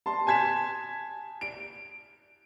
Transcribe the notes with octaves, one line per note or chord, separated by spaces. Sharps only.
A5 C6
G#5 A5 G#6 B6 E7
D7